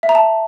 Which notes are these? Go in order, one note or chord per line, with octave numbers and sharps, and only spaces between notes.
E5
A#5
A5